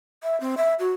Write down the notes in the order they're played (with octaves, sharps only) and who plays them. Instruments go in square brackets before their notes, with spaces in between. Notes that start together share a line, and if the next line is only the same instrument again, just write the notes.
[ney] E5
C4
E5
F#4